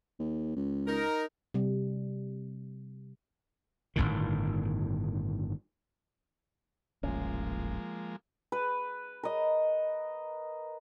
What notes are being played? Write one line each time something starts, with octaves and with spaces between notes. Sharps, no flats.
D#2
C#2
D#4 A#4
C3 G3
G1 C2 A2 D#3
D#1 A1 F3 G#3 A#3 C#4
B4
A#4 D#5